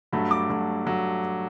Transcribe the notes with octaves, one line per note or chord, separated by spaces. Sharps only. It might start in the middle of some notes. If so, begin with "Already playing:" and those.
G2 F#3 A3 B5
D6
G2 F#3 A3
F#3 A3